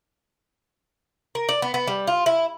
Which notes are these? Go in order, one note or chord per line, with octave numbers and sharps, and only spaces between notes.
A#4
D5
B3
B3
G3
F4
E4